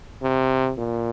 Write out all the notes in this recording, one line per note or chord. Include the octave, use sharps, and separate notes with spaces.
C3
A#2